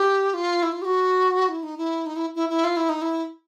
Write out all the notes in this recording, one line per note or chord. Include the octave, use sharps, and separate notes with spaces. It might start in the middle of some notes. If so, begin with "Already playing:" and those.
Already playing: G4
F4
E4
F4
G4
F#4
E4
D#4
E4
D#4
E4
E4
E4
F4
E4
D#4
E4